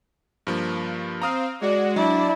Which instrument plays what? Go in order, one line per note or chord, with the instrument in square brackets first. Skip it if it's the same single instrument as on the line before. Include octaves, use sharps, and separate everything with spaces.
[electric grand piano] G2 F3 A#3
[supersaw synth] C4 F5 [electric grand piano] A#5 D#6 F6
[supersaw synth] G#3 F#4 [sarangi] D5
[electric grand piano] F#3 [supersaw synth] D4 D5 [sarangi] E4